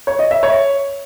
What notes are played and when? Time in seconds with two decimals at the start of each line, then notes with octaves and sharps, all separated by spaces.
0.07 C#5
0.19 D#5
0.31 E5
0.43 C#5